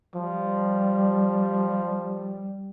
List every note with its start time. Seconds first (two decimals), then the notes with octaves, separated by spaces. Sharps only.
0.15 F3 G3